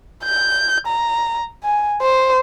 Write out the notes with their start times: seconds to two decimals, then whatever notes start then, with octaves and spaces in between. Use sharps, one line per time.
0.24 G6
0.87 A#5
1.64 G#5
2.01 C5